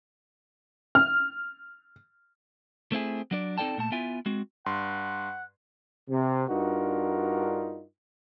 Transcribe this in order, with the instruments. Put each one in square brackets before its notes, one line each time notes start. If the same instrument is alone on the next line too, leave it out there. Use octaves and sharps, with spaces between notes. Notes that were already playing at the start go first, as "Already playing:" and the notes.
[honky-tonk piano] F6
[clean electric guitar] A3 C4 E4 G#4
F#3 D4 D5
C4 D#4 A4 D5 G5 A5
A#2 A3 A5
B3 E4 F4 E5 G#5
G#3 C4 F#4
[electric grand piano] G2 C6 [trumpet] F#5
[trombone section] C3
G2 D4 D#4 F4 F#4 A#4